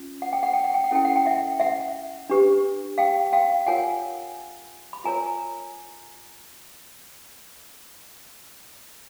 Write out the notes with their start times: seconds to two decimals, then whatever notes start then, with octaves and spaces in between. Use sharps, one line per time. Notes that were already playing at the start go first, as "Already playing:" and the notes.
Already playing: C#4 F4
0.22 F#5
0.33 G5
0.43 F#5
0.53 G5
0.64 F#5
0.74 G5
0.84 F#5
0.91 C#4 E4 A4 G5
1.05 F#5
1.16 G5
1.25 E5 F#5
1.60 E5 F#5
2.30 D4 G4 B4
2.98 F5 G5
3.33 F5 G5
3.67 F4 A#4 C#5 F#5 G#5
4.93 B5
5.04 F4 A#4 C#5 G#5 A#5